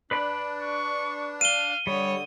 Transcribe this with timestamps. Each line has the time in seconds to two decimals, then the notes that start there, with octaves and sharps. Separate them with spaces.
0.11 D4 B4 D5 B5
0.63 C#6
1.41 F5 D#7 G7
1.87 D3 G3 C#5 D#6